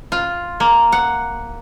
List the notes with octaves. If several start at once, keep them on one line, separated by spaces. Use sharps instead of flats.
F4
A#3
F#5